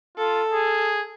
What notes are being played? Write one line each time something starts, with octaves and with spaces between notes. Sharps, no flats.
F4 A4
G#4